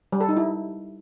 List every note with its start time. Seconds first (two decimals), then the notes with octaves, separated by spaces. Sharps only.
0.12 G3
0.21 A4
0.29 D#4
0.37 E4